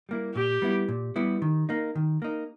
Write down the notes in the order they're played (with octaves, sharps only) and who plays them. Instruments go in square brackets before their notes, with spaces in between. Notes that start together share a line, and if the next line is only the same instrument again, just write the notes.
[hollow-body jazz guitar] G3 A#3 E4
[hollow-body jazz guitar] A#2 [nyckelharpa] G4
[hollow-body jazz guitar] G3 B3 E4
A#2
G3 B3 E4
D#3
A#3 D#4
D#3
A#3 D#4